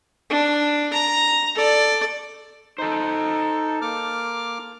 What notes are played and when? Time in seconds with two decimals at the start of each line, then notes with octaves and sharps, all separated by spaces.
0.30 D4
0.93 A#5
1.55 A4 D5
2.78 D#4 A4 C5
3.82 A#3 D6 F6